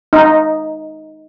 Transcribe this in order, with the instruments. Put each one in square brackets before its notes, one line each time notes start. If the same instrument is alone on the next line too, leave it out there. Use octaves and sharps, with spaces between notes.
[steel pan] D#4